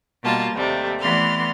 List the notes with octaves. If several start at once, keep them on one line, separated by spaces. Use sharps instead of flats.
B2 G3 A#3 F4 A5
D#2 C3 G3 A3
E3 A3 B3 D5 C6 F6